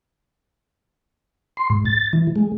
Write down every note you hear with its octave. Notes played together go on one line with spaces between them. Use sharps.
C6
G#2
A6
E3
G#3